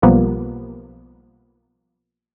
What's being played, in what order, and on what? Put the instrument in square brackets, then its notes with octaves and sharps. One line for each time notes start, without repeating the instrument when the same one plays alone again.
[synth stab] B1 F3 G3 A#3 B3